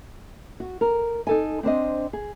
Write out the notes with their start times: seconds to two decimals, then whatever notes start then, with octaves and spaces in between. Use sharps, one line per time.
0.60 F#4
0.81 A#4
1.27 D#4 A4 G#5
1.63 C4 D4 C5 D#5
2.13 G#4